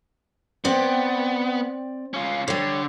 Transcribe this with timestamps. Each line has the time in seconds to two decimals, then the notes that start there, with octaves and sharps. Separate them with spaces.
0.64 B3 C4 D5 G5
2.14 C#4 F4
2.48 D3 G3 C#5